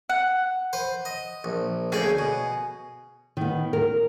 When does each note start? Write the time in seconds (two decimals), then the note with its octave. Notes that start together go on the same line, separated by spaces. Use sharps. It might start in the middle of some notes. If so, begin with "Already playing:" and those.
0.09 F#5
0.73 B4 C5
1.05 D#5
1.44 A#1
1.92 D2 C#3 G#4 G5 G#5
2.19 B2
3.37 D#3 B3
3.73 A#4